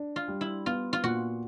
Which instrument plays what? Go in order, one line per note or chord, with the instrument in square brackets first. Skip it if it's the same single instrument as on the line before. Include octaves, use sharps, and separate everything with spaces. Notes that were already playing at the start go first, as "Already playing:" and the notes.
Already playing: [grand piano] D4
[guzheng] F4
[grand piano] G3
[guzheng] E4
[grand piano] B3 [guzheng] F4
[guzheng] F4
[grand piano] A#2 [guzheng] F#4